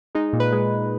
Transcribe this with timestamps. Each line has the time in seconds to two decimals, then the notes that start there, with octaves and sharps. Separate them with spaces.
0.15 G#3 D#4
0.33 A#2
0.40 B4
0.52 G#3